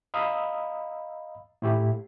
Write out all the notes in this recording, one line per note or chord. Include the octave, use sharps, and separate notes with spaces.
D#5 F5 A#5 B5 D#6 E6
A2 E4 G4